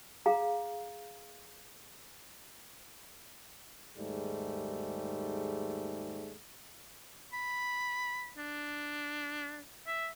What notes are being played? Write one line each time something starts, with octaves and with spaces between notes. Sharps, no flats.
G#4 F5 A#5
D#2 G#2 G3 A3 G#4
B5
D4
E5